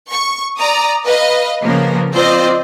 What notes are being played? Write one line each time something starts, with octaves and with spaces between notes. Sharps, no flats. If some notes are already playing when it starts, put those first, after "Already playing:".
C#6
D5 A#5 D#6
B4 D#5 F5
C#3 F3 A#3 B3 A#4
C4 F4 C5 D5 D#5